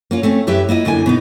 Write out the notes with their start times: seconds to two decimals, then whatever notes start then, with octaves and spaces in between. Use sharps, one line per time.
0.11 A#3 C#4 F4
0.23 A3 C4 C#4
0.47 F#2 E4 G4 B4 E5
0.69 A#3 E4 F4 D#5
0.85 F#2 D3 A#3 G#5
1.06 B2 B3 D#4